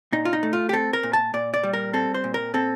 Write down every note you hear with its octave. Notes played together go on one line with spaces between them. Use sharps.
A#2 D#4
F4
D#4
A3
F4
G4
C4 A4
A#4
A#2
A5
A#2 D5
D5
G3
A#4
C4 A4
C5
A#2
A#4
C4 A4